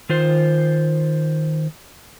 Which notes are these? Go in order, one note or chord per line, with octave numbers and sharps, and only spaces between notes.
D#3 F4 C5